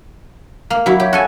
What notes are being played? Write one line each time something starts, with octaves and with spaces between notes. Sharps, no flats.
A#3
F#3 E4 F#4
G4 C#5
F#4 A4 G#5